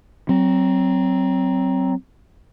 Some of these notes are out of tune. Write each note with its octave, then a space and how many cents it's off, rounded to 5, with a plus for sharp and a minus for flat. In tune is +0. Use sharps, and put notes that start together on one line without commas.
F#3 +25 C4 +0